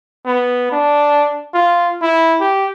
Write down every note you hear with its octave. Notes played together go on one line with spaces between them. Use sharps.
B3
D4
F4
E4
G4